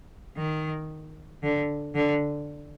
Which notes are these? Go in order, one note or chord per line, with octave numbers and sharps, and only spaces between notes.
D#3
D3
D3